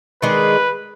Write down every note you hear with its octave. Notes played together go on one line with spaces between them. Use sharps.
D#3 G#3 D4 B4